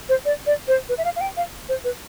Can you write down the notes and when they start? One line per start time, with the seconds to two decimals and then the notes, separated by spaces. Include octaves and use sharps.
0.09 C5
0.25 D5
0.46 D5
0.68 C5
0.89 B4
0.98 E5
1.05 F5
1.16 F5
1.21 G5
1.37 F5
1.69 C5
1.84 B4